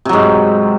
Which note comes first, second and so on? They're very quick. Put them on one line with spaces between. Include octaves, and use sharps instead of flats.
C3 F#3 G#2